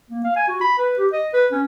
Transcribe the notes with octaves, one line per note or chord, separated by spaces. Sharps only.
A#3
F5
G#5
F#4
B5
B4
G4
D#5
B4
C#4